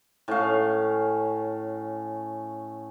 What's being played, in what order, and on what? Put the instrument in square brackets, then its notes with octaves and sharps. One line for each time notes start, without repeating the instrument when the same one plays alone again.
[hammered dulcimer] A2 C#4 F5